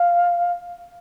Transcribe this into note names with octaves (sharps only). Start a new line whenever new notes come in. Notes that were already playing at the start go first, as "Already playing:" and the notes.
Already playing: F5